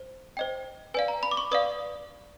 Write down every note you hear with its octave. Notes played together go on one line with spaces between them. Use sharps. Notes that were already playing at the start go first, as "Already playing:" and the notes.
Already playing: C5
C5 D#5 G5
B4 D5 F5 G#5
A#5
B5
D6
C#6
B4 D5 F5 D#6